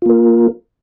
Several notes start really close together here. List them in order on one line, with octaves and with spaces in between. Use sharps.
F4 A#3 A#4